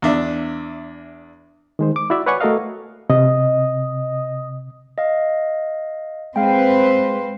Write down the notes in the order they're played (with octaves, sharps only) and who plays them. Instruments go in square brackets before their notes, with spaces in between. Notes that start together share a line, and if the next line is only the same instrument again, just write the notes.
[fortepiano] E2 D4 E5
[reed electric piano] D#3 G#3 C5
D6
E4 F#4 D5 E5
B4 C#5 D5 F#5 G#5 C#6
A3 F#4 A4 A#4 D#5 F5
[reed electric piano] C3 [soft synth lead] D#5
[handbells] D#5 F5
[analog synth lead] G#3 [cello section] C4 B4 C5 [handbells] F5 G5